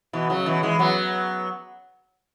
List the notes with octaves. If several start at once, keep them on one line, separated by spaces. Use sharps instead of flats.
B2 E3
C#3 F#3
B2 E3
E3 G#3
F#3 B3